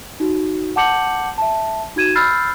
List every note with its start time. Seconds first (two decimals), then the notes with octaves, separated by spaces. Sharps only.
0.20 D#4 F#4
0.76 F#5 A5 D6 G6 C#7 F#7
1.38 E5 A5
1.96 D#4 F#4 G#6 D#7 E7
2.15 B5 E6 F6 G6 A6 C7